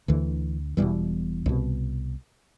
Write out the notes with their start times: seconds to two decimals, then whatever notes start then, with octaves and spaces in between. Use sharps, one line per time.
0.08 D2 D3 E3
0.77 E1 E2 B2 E3 G3
1.46 C2 B2